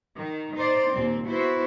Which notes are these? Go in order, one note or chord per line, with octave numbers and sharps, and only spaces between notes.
D#3
D#4 C5 D5
D#2 A#2 C4
B3 E4 F#4 C5